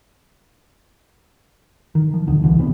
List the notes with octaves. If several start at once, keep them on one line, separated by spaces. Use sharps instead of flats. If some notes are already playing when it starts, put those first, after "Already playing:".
D#3
F3
D2 B2 D3 D#3
C2 D3 E3 F3
G1 C3 B3 D4